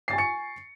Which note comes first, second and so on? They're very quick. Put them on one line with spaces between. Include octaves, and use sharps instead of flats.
C7 A6 G#5 C#6 C#7